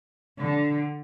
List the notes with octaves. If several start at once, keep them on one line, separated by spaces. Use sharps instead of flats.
D3